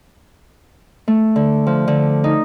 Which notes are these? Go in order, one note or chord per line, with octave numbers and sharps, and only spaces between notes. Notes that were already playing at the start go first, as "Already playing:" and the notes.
A3
D3
F3
D3
D#4